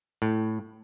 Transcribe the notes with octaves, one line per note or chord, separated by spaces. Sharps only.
A2